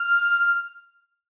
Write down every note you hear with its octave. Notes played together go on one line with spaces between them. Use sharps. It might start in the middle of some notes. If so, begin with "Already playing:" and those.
Already playing: F6